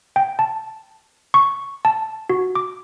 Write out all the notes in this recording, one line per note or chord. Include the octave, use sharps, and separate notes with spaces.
G5
A5
C#6
A5
F#4
D6